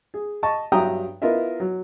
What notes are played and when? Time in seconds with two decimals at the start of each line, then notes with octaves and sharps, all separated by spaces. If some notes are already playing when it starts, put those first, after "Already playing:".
0.14 G#4
0.43 D#5 A5 C#6
0.72 G2 F#3 E5 G5 A#5 D#6
1.22 B3 E4 F4 A#4 D#5 E5
1.60 F#3